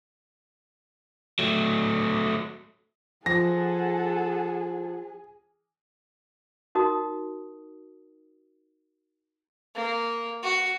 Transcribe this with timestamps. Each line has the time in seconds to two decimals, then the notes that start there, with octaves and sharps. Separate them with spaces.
1.39 F#3 A3
3.26 F3 G#4 A4 F#5 A#6
6.75 D#4 F#4 A#4 D#5 D#6
9.76 A#3
10.43 F#4